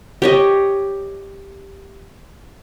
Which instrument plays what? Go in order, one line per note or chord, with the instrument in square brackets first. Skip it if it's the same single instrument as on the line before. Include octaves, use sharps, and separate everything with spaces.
[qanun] G4 C#5 D#5